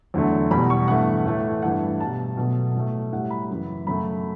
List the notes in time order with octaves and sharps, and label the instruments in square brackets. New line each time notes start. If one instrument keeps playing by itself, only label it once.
[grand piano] E2 D3 F#3 A3
E2 B2 G3 B5
C#6
G2 E3 A3 F#5
A2 E3 A3
G2 E3 A3 F#5
B2 G3 A5
B2 F#3 A3
A2 F#3 A3
A2 G3 F#5
B5
F#2 C#3 E3
F#2 C#3 F#3 A3 B5